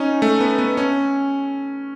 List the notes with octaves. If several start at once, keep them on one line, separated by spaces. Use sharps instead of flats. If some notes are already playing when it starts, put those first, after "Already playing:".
Already playing: C#4 D#4
A3
B3
B3
C#4